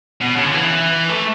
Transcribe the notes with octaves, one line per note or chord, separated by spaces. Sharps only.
B2
C#3
D3
E3
A3